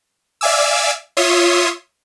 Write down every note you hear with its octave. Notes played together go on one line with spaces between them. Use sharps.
D5 E5 F5 G#5 D6 E6
F4 C#5 E5 C6 D#6